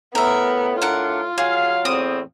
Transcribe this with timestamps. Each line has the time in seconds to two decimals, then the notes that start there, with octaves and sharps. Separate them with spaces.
0.15 A2 B3 A#4 E5
0.82 D4 F4 A#4 F#5
1.38 F#3 G#4 F5
1.85 E2 A2 C4 D#6